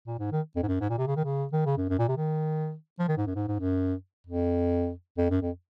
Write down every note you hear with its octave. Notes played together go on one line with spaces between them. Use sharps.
A#2
G#2
D#3
F2
G#2
F#2
G#2
A#2
C3
C#3
D#3
C#3
D#3
C#3
F#2
F#2
A#2
C3
D#3
F3
D#3
G#2
F#2
G#2
G#2
F#2
F2
F2
F#2
F2